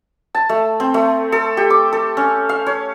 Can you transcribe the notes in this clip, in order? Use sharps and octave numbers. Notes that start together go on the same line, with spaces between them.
A5
A3
C4
A3
A4
G4
D6
A4
C#4
F5
C#5